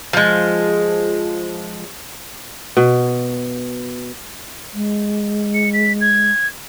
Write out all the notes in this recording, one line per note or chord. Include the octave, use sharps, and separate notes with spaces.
F3 G#3
B2
G#3
C#7
B6
G#6